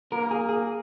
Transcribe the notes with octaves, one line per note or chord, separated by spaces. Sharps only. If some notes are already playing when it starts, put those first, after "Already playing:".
A#3 A#4
G#4
G#4